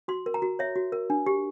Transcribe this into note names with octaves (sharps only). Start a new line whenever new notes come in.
F#4 C6
A#4
A#5
F#4
C#5 E5
F#4
A#4
D4
G4